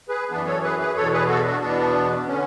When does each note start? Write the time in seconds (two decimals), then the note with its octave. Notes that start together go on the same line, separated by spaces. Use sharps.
0.09 G#4 B4
0.31 F#2 E3 B3 D4
0.47 A4 C#5
0.63 G#4 B4
0.80 G#4 B4
0.96 E2 B2 A4 C#5
1.12 G#4 B4
1.29 F#4 A4
1.46 D4 F#4
1.62 E2 B2 B3 D4
2.27 D3 C#4